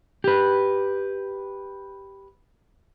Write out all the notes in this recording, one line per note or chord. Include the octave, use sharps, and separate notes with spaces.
G4 B4